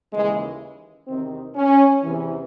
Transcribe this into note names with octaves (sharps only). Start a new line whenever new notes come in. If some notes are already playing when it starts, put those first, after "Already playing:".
D#2 C#3 E3 G#3
E2 C3 D#3 C4
C#4
E2 C3 E3